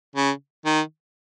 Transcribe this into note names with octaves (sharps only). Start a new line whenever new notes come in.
C#3
D#3